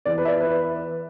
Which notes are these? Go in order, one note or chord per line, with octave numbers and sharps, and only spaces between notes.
E2 E3 D5
B4
E5
D5
B4